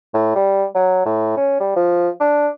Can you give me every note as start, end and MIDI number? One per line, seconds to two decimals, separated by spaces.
0.14 0.34 45
0.36 0.66 55
0.75 1.05 54
1.06 1.32 45
1.37 1.55 61
1.60 1.75 55
1.76 2.09 53
2.21 2.48 62